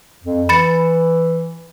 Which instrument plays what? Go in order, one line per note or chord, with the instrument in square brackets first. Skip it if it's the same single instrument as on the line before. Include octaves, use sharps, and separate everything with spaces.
[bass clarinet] F2
[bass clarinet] E3 [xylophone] B5 A6 C#7